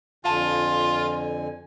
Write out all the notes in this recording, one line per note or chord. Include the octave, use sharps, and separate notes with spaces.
F2 D3 F4 F5 G#5 A5 B5